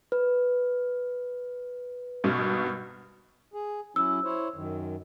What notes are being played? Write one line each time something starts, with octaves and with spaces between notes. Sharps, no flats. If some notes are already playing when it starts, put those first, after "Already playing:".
B4
G#1 G2 B2
G#4
F#3 C#4 E4 E6
E4 C5 C#5
F#2 D#3